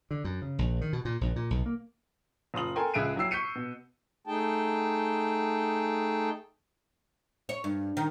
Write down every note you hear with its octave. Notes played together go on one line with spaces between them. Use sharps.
D3
F#2
C#3
A#1
D#3
B2
A#2
A#1
A#2
B1
A#3
F#1 F4 D#6 F#7
A4 A#4 G5 G#5 C6
C#2 G#4 E5 F#6 D7 D#7
F#3 E4 G5 E6 C7
C#6 G6 B6 C#7 D#7
B2
A3 D#4 G#4 G5 A5
C#5
G2
D#3